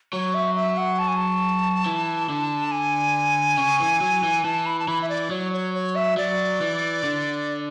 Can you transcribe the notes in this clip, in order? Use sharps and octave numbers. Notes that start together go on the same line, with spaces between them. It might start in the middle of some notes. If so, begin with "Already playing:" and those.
F#3 C#5
E5
E5
F#5
A5
G#5
A5
E3
D3
G#5
C#3
E3
F#3
E3
E3 A5
B5
A5
E3 B5
E5
D5
F#3 C#5
C#5
C#5
E5
F#3 D5
E3
D3